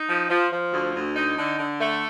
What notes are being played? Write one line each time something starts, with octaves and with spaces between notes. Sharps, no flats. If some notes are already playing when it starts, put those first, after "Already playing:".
Already playing: D#4
F3
F3
F3
D2
D2
D#4
D3
D3
A3